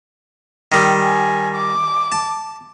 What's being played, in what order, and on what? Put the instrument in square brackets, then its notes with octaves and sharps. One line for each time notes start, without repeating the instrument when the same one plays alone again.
[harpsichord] D#3 G3
[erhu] G#5
D6
[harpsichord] A5